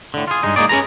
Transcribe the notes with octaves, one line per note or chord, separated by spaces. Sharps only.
A2 D3
F4 G#4
G2 G#3 D#4
G#3 A#3 C4 D#4 G#4 D5
C#4 G#4 B4 A#5